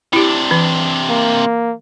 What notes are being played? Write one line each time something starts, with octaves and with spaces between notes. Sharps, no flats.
C3 D4 E4 G4
E3
A#3